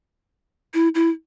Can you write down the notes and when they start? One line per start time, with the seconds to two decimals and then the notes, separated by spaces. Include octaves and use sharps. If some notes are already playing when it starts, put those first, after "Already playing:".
0.74 E4
0.95 E4